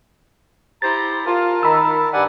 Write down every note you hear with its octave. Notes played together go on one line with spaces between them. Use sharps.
E4 G4 C5 A#5 A6
F4 A#4 A5
D#3 A#5 B5 E6
G2 D5 F#5 G#5